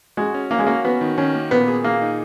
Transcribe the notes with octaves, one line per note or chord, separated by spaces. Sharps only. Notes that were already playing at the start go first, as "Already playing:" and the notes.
G#3 F#4
C#4
A#3 C#4
G#3
A#3 F#4
B3 F#4
D#3
D#3 C#4
A#3
A#2 B3
G#4
A#3 G#4
D#4